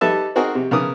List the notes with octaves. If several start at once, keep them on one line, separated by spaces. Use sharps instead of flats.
G3 D#4 A4 B4 E5 A5
C4 D#4 F#4 G#4 A#4 D#5
C3
C#3 B3 A#4 D#6